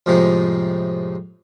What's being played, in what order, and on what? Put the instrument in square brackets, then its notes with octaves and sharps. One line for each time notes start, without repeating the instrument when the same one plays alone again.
[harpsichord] F2 A2 C3 F3 G#3 D#4